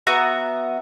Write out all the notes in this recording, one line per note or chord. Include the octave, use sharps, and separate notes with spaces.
B3 F#4 E5 A#5